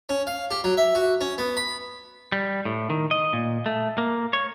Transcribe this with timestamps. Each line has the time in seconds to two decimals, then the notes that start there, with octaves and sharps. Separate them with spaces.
0.09 C#4
0.27 F5
0.51 G4
0.64 F#3
0.77 E5
0.95 F#4
1.21 C#4
1.38 B3
1.57 B5
2.32 G3
2.65 A2
2.90 D#3
3.11 D#5
3.33 A#2
3.66 A3
3.98 A#3
4.33 C#5